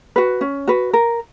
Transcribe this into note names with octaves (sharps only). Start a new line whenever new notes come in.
F#4 B4
C#4
F#4 B4
A#4